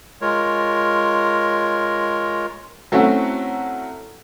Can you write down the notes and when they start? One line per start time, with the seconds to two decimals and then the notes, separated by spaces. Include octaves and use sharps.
0.21 G#3 F4 A#4 C#5
2.92 F#3 A3 C4 C#4 E4 F#4